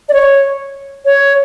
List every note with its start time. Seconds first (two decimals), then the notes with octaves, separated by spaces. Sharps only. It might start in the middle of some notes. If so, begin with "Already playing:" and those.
0.09 D5
0.13 C#5
1.05 C#5